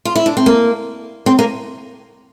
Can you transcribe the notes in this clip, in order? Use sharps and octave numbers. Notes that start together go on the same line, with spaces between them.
F4
E4
D4
C4
A#3
C4
A#3